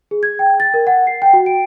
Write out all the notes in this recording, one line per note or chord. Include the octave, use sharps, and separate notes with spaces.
G#4
G#6
G5
A6
A#4
F#5
C7
G5
F#4
D7